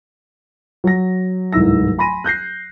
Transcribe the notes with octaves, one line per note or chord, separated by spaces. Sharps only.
F#3 A#6
D1 C2 G#2 E4 E6 A#6
G#5 B5 C6 A#6 D#7
F#6 G6 A#6 C7